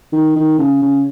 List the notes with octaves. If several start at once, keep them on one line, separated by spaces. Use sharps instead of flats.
D#3
D#3
C#3
C#3